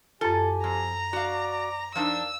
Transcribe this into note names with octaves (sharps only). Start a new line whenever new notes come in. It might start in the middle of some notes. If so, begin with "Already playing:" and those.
F#2 F4 G4 A4 G#5
F2 A#5
F#4 D5 F5 D6
F3 D4 D#4 A#4 D5 F5 E6